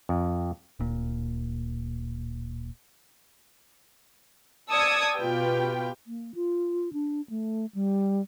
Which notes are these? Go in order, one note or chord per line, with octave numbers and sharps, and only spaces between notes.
F2
D1 A#2
D5 A5 D#6 E6 G#6 C#7
B2 F4 G4 B4 G5
A#3
F4
D4
A3
G3